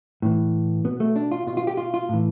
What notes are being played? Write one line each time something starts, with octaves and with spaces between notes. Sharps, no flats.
A2 E3
B2 B3
A3
D4
F4
B2 F4
F4
G4
F4
F4
A2 E3